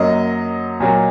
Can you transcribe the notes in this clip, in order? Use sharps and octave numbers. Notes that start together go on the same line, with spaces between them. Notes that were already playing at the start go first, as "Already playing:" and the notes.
Already playing: F#2 F#3 A#3 D#5
A#2 F#3 A#3